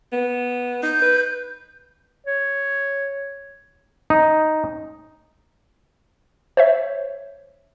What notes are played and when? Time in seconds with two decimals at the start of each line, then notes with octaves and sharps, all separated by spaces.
0.12 B3
0.83 D#4 G6
1.02 B4
2.27 C#5
4.10 D#4
6.57 C5 C#5 E5